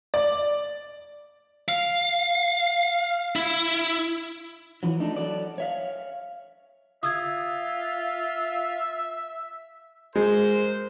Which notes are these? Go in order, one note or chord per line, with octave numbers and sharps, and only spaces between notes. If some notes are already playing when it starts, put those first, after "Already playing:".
D5
F5
E4
E3 F#3
A3 D4 D#4
F#3 A4 D5
C#5 E5 F5
F4 E5 D#6 E6 G#6
G#3 A#4 C5